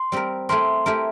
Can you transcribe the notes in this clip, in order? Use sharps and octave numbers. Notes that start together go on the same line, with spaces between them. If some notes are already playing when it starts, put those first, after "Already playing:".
Already playing: C6
G3 C4 G4 A#4
A3 E4 G4 A#4 C6
A3 E4 G4 A#4